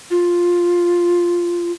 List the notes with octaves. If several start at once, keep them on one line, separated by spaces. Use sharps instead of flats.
F4